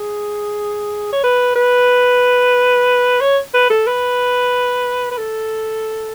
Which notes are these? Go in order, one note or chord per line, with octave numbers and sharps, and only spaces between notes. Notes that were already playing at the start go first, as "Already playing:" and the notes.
Already playing: G#4
C#5
B4
B4
C#5
B4
A4
B4
B4
A4